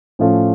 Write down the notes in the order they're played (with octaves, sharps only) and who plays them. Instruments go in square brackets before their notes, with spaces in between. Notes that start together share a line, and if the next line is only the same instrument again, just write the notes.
[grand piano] A2 F3 A3 C#4 F4